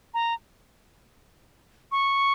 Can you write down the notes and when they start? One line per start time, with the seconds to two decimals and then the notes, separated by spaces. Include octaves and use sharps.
0.14 A#5
1.92 C#6